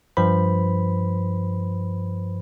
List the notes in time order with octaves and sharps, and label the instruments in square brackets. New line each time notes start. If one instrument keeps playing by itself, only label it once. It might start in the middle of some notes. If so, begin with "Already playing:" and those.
[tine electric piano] G2 F3 B4 C5 B5